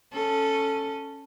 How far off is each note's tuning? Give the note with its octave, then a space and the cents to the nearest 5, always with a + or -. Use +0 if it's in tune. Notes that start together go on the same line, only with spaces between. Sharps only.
C#4 -5 A4 +0